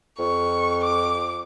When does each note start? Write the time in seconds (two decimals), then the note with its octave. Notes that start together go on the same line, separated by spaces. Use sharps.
0.19 F2 C#6
0.84 D6